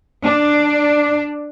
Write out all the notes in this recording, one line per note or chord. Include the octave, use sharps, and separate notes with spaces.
D4